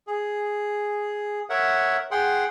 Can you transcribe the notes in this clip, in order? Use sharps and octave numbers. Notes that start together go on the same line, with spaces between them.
G#4
A#4 C#5 E5 F#5
G#4 F#5 G5 C6